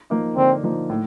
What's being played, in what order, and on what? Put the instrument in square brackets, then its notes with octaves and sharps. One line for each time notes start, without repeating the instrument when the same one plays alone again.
[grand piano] F3 A#3 D#4
[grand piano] D3 [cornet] C4
[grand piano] F3 A#3 D#4
A2